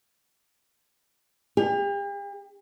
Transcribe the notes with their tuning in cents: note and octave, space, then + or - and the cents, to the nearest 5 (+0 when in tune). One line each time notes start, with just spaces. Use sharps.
G4 +40